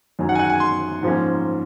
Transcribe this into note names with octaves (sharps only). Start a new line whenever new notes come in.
F#2 D#3 F#3 C#4
F#5
G#5
F#5
G#5
C6
G#2 F3 A#3 C#4